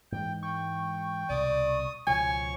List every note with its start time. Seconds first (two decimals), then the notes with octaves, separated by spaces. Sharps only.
0.12 G#2 E3 G#3 G5
0.43 G5 C#6
1.29 C2 B2 D5 D#6
2.07 C#2 B2 F3 C#5 G#5 C#6